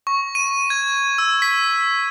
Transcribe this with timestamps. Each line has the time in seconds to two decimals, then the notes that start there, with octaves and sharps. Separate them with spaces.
0.07 C#6
0.35 D#7
0.70 G#6
1.18 E6
1.42 B6